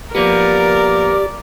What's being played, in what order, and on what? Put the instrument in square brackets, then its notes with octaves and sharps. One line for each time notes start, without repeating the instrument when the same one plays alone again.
[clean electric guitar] F3 A#3 B3 [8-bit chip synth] G4 [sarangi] A#4 [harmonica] D5